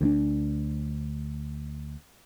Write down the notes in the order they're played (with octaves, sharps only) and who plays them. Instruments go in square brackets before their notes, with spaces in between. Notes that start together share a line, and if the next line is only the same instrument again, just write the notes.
[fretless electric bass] D2 G3 D4